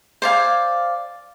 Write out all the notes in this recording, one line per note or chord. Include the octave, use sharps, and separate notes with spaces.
C5 D5 F5 G#5